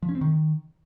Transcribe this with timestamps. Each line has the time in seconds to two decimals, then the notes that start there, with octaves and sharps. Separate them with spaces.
0.03 F3
0.09 C#4
0.15 C4
0.21 D#3